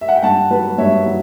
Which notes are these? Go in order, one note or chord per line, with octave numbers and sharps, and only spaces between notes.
E5
F#5
G5
G2 F#5 A5
F#3 B4
G2 C#5 E5
F#3